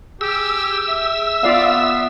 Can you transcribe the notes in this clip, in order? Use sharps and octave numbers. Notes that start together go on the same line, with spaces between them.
G4 G#4 E6
E5
B3 F4 D5 F5